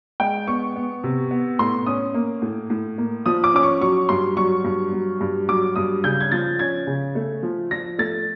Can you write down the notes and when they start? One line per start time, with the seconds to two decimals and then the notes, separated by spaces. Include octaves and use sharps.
0.20 G#3 G5
0.47 B3 C#6
0.76 B3
1.04 C3
1.31 B3
1.59 A2 C6
1.86 C#4 D#6
2.14 A#3
2.42 A2
2.70 A2
2.98 A#3
3.26 F3 D#6
3.44 D6
3.54 C#4 D6
3.63 C#6
3.81 F#3 C#6
4.09 G2 C6
4.37 F#3 C#6
4.64 G2
4.93 F#3
5.21 G2
5.48 F#3 D6
5.76 G2 D#6
6.04 C#3 G6
6.21 G#6
6.32 F3 A6
6.59 C#4 G#6
6.87 C#3
7.15 A3
7.43 F3
7.71 F3 A#6
7.99 A3 A6